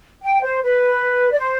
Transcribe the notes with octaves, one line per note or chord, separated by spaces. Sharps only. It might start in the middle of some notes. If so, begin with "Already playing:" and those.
G5
C5
B4
D5
C5